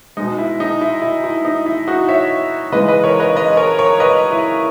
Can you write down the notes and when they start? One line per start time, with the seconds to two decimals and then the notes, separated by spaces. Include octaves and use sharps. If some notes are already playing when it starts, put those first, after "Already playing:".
0.17 B2 G#3 D#4
0.38 E4
0.60 D#4
0.81 E4
1.02 E4
1.24 E4
1.45 D#4
1.66 E4
1.87 D#4 F#4
2.08 C#5 E5
2.72 C#3 E3 G#3 B4 D#5
2.88 B4 D#5
3.04 A#4 C#5
3.20 B4 D#5
3.35 B4 D#5
3.57 A#4 C#5
3.79 A#4 C#5
4.00 B4 D#5
4.31 E4